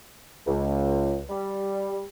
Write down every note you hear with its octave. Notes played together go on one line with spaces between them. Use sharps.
C#2
G3